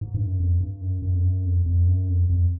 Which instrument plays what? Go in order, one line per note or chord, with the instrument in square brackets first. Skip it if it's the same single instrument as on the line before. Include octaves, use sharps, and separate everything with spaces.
[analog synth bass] G#2
G2
F#2
F2
G2
F#2
F#2
F2
F#2
F2
F2
F#2
F2
F2